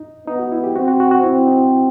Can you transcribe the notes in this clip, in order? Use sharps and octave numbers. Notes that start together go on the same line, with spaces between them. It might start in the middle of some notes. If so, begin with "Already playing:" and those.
Already playing: D#4
B3 D#4
F#4
E4
G4
C4 F#4
F#4
F#4
F#4
C4 E4
D#4